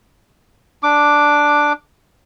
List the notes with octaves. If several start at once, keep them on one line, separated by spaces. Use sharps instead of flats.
D4 D6